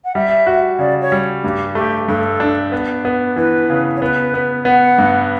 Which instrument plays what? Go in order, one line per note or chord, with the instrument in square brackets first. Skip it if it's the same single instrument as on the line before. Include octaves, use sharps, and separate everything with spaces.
[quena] F#5
[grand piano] G3 [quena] E5
[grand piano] F#4
[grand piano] C#3 [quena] D5
[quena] C#5
[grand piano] G3
[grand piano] G2 [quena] G4
[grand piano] A3 [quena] G4
[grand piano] G2 [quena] A4
[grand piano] D4
B3
B3
[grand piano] E3 [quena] B4
[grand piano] C#3
[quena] C#5
[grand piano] B3 [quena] B4
[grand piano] B3
[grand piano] B3 [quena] F#5
[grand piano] G2